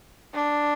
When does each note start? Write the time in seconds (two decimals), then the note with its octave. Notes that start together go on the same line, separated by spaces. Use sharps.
0.34 D4